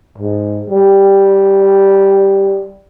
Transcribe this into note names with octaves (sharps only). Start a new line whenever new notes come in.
G#2
G3